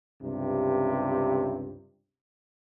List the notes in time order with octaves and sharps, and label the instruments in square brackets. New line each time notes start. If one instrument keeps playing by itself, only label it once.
[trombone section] C#2 G2 C3